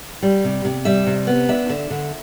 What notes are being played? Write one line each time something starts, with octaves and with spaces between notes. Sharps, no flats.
G3
C3
C3
G3 E5
C3
B3
D4 E5
D3
D3